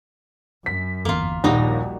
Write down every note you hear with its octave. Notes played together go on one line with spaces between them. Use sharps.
F#2 B6
G1 E2 A#3 F4
A#1 D#2 A#2 G3 D#4 F#4 A#5 A#6